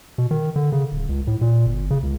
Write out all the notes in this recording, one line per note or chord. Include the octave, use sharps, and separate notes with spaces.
B2
D#3
D3
C#3
D1
C#2
A2
A#2
G1
C#3
C#2